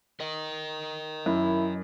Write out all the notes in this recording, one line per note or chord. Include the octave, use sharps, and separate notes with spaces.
A#4 D#5
F#2 E4